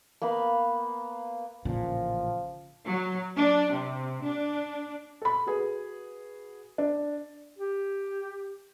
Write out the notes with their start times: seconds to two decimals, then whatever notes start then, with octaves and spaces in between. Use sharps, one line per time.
0.22 A#3 B3 F5 B5
1.65 A1 A#2 C#3 F3
2.87 F#3
3.36 D4
3.72 C3
4.24 D4
5.22 A4 B5
5.47 F#4 G#4 B4
6.78 D4
7.59 G4